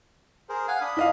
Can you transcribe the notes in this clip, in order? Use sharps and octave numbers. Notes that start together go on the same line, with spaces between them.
G#4 A#4 C5
F5 F#5 G#5
D4 B5 D#6
E4 D#5 F5